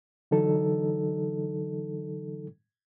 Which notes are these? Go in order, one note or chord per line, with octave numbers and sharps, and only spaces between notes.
D3 E3 F#3 D#4 A4